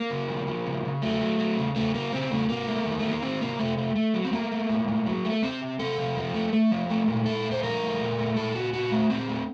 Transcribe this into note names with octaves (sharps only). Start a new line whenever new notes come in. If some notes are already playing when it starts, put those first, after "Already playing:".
Already playing: A#3
C#3
F3
F3
C#3
C#3
F#3 A3
F#3
F#3
C#3
C#3 A3
C#3 A#3
C#3 C4
C#3 A3
C3 A#3
A3
D#3
D#3 A3
A#3
D#3 C4
C3 A#3
C3 A3
A3
A3
F#3
C4
A3 A#3
A3
A2
A2
F#3
A3
C3 C4
C3
C3 A4
C3
F3
A3
A3
F3
A3
A#2
A#2 A4
A3
C5
F3 A#4
A3
A#2
A3
A#2 A4
A#2 F#4
A#2 F#4
A3
A#2 C4
A3